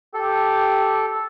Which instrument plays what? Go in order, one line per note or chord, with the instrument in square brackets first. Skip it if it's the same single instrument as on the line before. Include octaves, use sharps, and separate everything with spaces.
[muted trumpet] G4 [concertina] A4